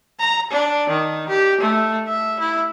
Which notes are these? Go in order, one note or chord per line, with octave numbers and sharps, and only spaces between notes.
A#5
D4
D#3
G4
A3
E5
E4